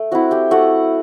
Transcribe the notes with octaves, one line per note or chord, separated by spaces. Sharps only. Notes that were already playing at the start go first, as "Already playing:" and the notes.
Already playing: A3
C4 E4 F#4 F#5
G4 G5
A3 F#4 F#5